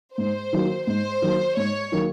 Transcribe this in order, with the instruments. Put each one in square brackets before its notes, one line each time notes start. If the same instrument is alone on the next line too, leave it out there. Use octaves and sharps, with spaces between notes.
[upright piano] G#2 [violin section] C5
[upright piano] D#3 F#3 A#3
[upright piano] G#2 [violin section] C5
[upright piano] D#3 F#3 A#3
[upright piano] G#2 [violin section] C#5
[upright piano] D#3 F#3 A#3